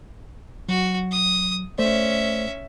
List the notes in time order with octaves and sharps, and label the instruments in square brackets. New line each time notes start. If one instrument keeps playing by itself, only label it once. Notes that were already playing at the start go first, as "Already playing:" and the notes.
[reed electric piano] F#3 [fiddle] F#4
[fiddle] D#6
[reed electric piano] A3 C5 D5 [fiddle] C#4 E5